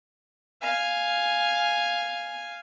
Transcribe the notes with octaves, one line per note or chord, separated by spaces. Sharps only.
F5 G#5